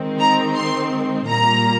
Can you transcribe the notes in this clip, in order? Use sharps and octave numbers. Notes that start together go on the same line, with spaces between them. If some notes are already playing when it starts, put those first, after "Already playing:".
Already playing: D#3 G#3 C4
A#5
C6
A#2 G3 A#3 A#5